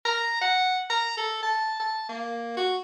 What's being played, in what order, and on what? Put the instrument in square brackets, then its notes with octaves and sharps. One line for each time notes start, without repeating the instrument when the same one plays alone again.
[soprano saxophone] A#5
F#5
A#5
A4
A5
A5
A#3
F#4